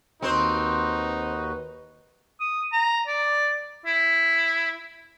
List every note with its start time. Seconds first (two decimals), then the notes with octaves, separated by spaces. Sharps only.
0.22 D#2 C4 D#4 F#4 B4 C5
2.40 D#6
2.72 A#5
3.07 D5
3.86 E4